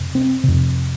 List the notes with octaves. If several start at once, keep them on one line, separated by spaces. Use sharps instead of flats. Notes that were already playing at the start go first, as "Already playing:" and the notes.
Already playing: F2 C3
C4
F2 C3